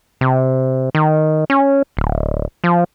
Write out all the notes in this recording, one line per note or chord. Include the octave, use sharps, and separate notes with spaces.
C3
D#3
C#4
D1
F3